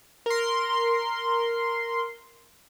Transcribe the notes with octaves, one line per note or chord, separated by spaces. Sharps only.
A#4 C6